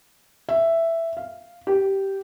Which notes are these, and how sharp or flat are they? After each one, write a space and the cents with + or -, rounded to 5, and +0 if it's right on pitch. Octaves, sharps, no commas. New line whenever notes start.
E5 +5
F5 -5
G4 -10